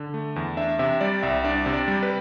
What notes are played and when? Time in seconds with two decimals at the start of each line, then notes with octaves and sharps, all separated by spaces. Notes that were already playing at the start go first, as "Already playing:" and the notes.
Already playing: D3
0.14 A3
0.36 E2
0.57 D4 E5
0.79 C3 E5
1.01 G3 D5
1.23 C2 E5
1.44 D4 D5
1.66 C3
1.73 D5
1.88 G3
2.03 B4